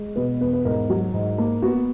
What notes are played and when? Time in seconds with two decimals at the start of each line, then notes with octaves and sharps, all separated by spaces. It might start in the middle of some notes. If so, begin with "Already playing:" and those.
Already playing: G#3
0.16 B2 B4
0.40 E2 B4
0.53 B4
0.65 G#2 A#4
0.90 F#3
1.14 G#2
1.38 A#3
1.62 B3 F#4